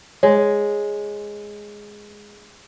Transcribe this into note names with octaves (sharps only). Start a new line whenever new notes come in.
G#3 C#5